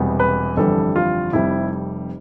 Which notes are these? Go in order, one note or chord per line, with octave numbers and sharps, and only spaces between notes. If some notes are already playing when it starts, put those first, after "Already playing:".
Already playing: E1 E2 C3 G3 B3
B4
G1 F2 E3 G3 D4 A4
F4
F1 F2 C3 G3 E4